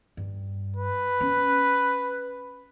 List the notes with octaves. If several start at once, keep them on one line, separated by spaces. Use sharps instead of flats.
G2
B4
C#4